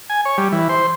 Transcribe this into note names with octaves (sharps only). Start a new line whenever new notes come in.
G#5
C#5
G3
E3
C5